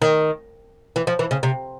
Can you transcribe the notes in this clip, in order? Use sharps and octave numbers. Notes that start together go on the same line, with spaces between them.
D#3
E3
F3
E3
C#3
C3